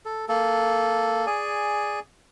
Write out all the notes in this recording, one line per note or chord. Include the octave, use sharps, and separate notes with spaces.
A4
A#3 A4
G#4 D5 G#5